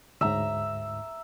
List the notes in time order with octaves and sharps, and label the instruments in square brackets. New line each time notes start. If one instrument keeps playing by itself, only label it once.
[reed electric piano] D2 G#2 [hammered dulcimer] E5 A#5